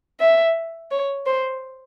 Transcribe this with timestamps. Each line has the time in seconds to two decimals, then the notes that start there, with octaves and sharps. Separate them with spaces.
0.20 E5
0.91 C#5
1.26 C5